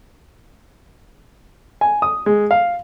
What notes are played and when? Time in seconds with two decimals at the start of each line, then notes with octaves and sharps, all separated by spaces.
1.81 G#5
2.02 D#6
2.26 G#3
2.51 F5